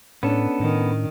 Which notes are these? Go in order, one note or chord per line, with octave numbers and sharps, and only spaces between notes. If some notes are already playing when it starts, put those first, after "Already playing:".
A2 B3 C#4 D4 A4
A2 D#3